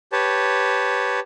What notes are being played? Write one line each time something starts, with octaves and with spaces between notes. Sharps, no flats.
G4 B4 C#5 A5